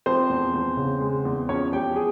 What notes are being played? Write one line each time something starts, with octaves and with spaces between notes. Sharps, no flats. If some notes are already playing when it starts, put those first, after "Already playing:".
F3 C4 C5
E2
E2
C#3
G#3
E2
F3 C#4 C#5
E2 G4 G5
G#4